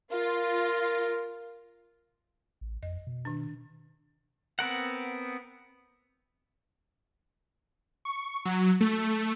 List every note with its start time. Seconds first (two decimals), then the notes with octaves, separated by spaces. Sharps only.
0.12 F4 A#4
2.61 A1
2.83 F2 D#5
3.07 B2
3.25 D#3 D4
4.59 B3 C4 A#4 F#5
8.05 C#6
8.45 F#3
8.81 A3